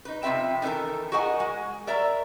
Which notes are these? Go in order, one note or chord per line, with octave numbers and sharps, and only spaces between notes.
D#4 B4
C3 F3 C4 E5 G5
D#3 E3 C#4 A4 A#4
F#4 G#4 A#4 D#5 F#5 G#5
G#3
A#4 D5 E5 A#5